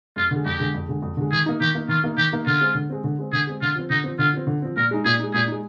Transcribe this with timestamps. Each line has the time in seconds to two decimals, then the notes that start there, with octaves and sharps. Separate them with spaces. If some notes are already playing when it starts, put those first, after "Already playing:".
0.16 F2 F4
0.31 D3 G#3
0.45 F2 G4
0.60 D3 G#3
0.74 F2
0.88 D3 G#3
1.02 F2
1.17 D3 G#3
1.32 D#3 G#4
1.46 A#3 D#4
1.61 D#3 G4
1.75 A#3 D#4
1.89 D#3 F4
2.04 A#3 D#4
2.17 D#3 G4
2.32 A#3 D#4
2.46 D3 F4
2.61 G#3 C4
2.75 D3
2.90 G#3 C4
3.04 D3
3.19 G#3 C4
3.32 D3 G#4
3.47 G#3 C4
3.61 D3 F4
3.75 F3 C4
3.90 D3 D#4
4.04 F3 C4
4.19 D3 F4
4.33 F3 C4
4.47 D3
4.62 F3 C4
4.76 A#2 A#4
4.91 G#3 D#4
5.05 A#2 G#4
5.19 G#3 D#4
5.34 A#2 G#4
5.47 G#3 D#4